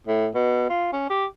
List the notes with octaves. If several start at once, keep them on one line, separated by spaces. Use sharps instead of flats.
A2
B2
F4
C#4
G4